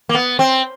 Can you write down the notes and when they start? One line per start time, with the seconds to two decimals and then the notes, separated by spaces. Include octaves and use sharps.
0.09 A#3
0.14 B3
0.39 C4